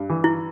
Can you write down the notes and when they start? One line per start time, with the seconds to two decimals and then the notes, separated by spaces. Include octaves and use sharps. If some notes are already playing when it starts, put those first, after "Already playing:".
Already playing: G2
0.10 E3
0.24 E4